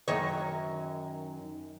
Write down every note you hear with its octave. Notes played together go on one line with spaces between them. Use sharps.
F#2 D#3 C#5